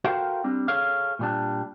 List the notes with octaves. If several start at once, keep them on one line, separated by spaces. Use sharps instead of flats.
F#4 A4 A#4 C5 F5 G5
G3 C4 D4
G#4 A4 C#5 F5
A#2 G3 D4